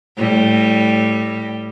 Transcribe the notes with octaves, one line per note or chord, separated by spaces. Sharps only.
A2 G3